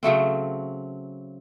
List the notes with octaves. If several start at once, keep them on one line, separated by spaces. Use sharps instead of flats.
C#3 F#3 A3 C4